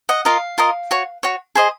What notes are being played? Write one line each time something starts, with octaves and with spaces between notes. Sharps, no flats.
D#5 F#5
F4 A#4 D#5 F5
F4 A#4 D#5
F#4 C#5
F#4 C#5
G#4 C5 D#5